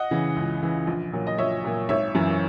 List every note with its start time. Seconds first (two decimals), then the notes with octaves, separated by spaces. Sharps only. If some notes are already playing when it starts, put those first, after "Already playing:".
Already playing: D#5 F#5
0.11 C#3 E3
0.36 C#2
0.62 C#3 E3
0.87 A#1
1.12 A#2 F#3
1.27 D#5
1.38 A#1 C#5 E5
1.64 A#2 F#3
1.89 G#1 C#5 E5
2.15 F#2 E3